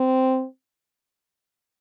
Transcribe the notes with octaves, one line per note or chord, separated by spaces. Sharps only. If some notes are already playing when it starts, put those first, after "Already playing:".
Already playing: C4